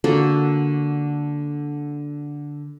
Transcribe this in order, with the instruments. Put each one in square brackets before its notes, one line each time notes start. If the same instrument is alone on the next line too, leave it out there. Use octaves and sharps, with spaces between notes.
[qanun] D3 A#3 F#4 A4